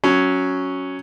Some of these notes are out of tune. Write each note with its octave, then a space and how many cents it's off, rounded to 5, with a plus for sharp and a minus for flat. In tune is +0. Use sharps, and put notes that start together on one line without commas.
F#3 +0 C#4 +0